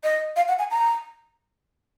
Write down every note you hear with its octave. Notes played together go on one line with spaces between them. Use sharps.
D#5
F5
F#5
G#5
A#5